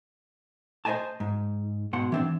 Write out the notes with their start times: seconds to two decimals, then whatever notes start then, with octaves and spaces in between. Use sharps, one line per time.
0.85 C5 D5 D#5 G#5 A5
1.20 G#2
1.93 G#2 B2 F#5 C6
2.12 E3 C4 D4